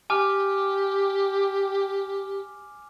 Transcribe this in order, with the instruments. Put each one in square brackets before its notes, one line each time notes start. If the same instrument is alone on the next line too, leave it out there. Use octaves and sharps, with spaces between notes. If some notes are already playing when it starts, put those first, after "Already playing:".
[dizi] G4 [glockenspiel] G#5 D6 F6